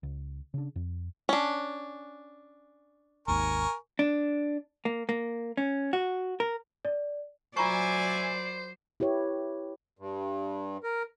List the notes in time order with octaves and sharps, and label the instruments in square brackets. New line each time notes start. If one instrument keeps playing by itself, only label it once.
[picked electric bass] C#2
C#3 D4
F2
[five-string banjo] C#4 D4
[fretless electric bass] G#1 D#2 [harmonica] A#4 G#5 C#6
[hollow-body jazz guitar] D4
A#3
A#3
C#4
F#4
A#4
[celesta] D5
[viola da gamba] F#3 D5 [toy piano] F4 A#5 C#6 [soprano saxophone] C5 [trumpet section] E5 G#5
[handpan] E4 G4 B4 C#5
[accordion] G2
A#4